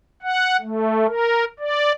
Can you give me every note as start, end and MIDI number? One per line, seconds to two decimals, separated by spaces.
0.22 0.57 78
0.61 1.07 57
1.07 1.45 70
1.59 1.92 74